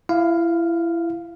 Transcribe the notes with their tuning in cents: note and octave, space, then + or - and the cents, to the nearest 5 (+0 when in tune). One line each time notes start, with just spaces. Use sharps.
E4 +25 F5 +0